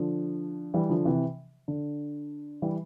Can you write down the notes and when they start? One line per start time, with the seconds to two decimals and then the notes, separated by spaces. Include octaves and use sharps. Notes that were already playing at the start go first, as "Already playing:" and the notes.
Already playing: D3 F3
0.74 E3 G3
0.90 D3 F3
1.05 C3 E3
1.68 D3
2.62 E3 G3